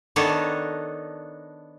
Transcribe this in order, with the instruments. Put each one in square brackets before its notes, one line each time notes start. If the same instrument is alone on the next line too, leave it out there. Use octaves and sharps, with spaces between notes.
[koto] D#3 B3 D4 D#4 A4 C#5